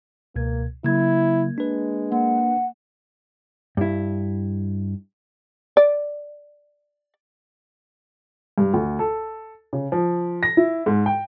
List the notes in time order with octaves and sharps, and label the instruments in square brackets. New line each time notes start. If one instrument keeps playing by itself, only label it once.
[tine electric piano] C#2 B2 G#6 [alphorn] A#3
[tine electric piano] C#3 F#3 [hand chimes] A#3 G#6 [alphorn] E4
[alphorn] G#3 [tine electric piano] D4 B4
[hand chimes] A#3 [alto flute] F#5
[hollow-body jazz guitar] G2 E4
[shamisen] D5
[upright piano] G2
D2
A4
C#3
F3
A#6
E4
G#2
G5